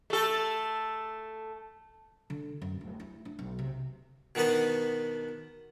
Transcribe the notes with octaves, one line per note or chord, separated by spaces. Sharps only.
A3 A4
D3
F#2
D1
E4
D4
B1
C3
B2 D#3 B3 D4 B4